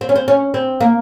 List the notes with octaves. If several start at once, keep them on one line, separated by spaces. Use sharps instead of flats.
C4
C#4
C4
C#4
C4
A#3